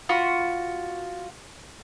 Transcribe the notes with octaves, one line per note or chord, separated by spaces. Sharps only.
F4 F#4 B5